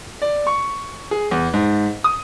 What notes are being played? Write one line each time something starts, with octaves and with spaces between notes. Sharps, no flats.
D5
C#6
G#4
E2
G#2
D#6